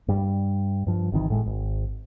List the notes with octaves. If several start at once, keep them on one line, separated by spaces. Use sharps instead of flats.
G2 G3
G2 F3
G#1 C3 D#3 E3
A2 G#3
G#1